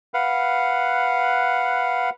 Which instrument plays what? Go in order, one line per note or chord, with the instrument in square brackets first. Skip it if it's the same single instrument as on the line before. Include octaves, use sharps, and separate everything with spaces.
[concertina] B4 F5 F#5